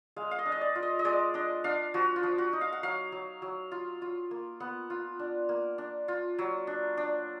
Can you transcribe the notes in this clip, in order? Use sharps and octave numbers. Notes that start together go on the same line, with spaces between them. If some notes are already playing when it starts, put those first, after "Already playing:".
G#3 F5
F5
D#5
D4
D#5
D5
F4
D#5
D#5
G#3 D5
D4 D#5
D4 F5
F3 F#4
F4
F3
F#4
D#4
F5
F#5
F#3 F5
F#3
F#3
F4
F4
A#3
B3 F#5
F4
D4
A#3
D4
F4
F#3
D4
D4